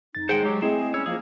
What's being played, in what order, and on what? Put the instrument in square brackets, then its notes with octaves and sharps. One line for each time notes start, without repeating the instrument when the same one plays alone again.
[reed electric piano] F2 A6 [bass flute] D#4
[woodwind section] A2 D#3 G#3 [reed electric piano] G#4 [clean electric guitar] C5 F#5 G5
[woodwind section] F#3 [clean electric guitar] G#3 G4
[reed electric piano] A3 E4 [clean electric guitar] C4 [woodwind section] G#4 [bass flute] D#5
[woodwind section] G3 C#4 [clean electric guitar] C#5 [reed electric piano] E6
[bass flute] F3 [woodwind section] A#3 [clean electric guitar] G#4